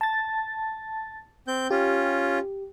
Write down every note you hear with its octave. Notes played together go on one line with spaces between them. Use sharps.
A5 A6
C4 G6
C#4 F4 G4